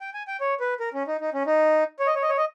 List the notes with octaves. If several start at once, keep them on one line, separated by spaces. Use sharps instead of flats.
G5
G#5
G5
C#5
B4
A#4
C#4
D#4
D#4
C#4
D#4
C#5
D#5
C#5
D#5
C#5
D#5